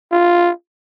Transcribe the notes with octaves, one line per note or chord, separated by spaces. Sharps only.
F4